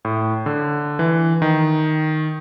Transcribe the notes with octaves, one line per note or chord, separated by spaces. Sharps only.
A2
D3
E3
D#3